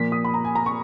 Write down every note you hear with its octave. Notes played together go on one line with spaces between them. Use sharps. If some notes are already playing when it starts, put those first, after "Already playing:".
Already playing: A#2 F3 A#3 B6
D#6
B5
A#5
G#5
A#5
C#6